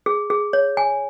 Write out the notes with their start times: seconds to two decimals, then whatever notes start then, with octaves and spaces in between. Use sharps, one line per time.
0.06 G#4
0.30 G#4
0.53 C#5
0.77 G#5